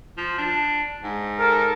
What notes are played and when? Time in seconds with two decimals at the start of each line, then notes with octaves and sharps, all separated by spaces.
0.17 F3
0.38 D4
1.03 G#2
1.39 A4 A#4